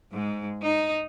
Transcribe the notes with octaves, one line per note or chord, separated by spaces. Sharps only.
G#2
D#4